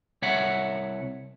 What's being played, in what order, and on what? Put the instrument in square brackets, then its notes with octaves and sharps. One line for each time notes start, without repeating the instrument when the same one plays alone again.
[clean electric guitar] C2 C#5 E5 F#5